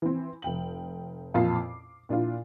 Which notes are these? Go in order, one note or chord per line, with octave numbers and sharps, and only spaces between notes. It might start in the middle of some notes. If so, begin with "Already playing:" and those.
E3 C4
F1 G5 F#7
A1 F2 A#2 F4 A5 C7
D6
A#2 D4 E4 F4